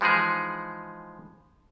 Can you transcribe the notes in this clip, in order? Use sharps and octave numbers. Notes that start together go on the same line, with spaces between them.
E3 F3 G#3 D#4 G#4